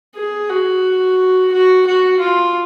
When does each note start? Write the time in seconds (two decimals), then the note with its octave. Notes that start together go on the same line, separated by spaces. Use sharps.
0.16 G#4
0.50 F#4
1.52 F#4
1.87 F#4
2.20 F4